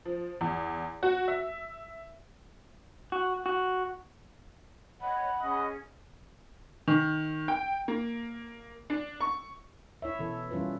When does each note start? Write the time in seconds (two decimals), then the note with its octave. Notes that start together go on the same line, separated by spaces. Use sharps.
0.05 F3
0.41 E2
1.03 F#4
1.28 E5
3.12 F#4
3.46 F#4
5.01 C#5 D#5 F#5 B5
5.41 C#4 G#4 D#5
6.88 D#3
7.48 G5
7.88 A#3
8.90 D4
9.21 C#6
10.02 E4 C#5 E5
10.19 B2 E3 A4
10.51 E3 G3 C#4 F4 B4